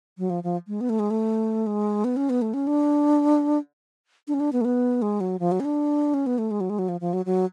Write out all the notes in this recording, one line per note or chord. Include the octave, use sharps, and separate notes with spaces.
F#3
F3
F3
G#3
B3
A3
G#3
A3
G#3
B3
C#4
B3
A3
C#4
D4
D4
C#4
D4
B3
A3
B3
G#3
F#3
F3
F#3
C#4
D4
C#4
B3
A3
G#3
F#3
G#3
F#3
F3
F3
F#3
F#3